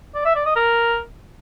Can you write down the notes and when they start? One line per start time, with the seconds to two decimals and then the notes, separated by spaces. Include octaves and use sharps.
0.15 D5
0.25 E5
0.35 D5
0.46 D#5
0.56 A#4